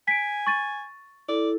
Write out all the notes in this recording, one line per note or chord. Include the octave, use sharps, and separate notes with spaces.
G#5 B6 D7
C#6 A6 D#7
E4 A4 D5